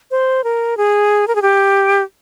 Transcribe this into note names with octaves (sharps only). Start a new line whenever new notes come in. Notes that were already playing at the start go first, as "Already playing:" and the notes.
C5
A#4
G#4
A#4
G#4
G4